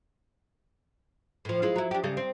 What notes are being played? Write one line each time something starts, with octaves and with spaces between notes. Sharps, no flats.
A2 F3
G#3 E4 F4
F#3 E4
D4 G4
C#3 G3 A4
C4